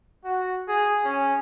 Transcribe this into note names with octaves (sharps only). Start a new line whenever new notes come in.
F#4
G#4
C#4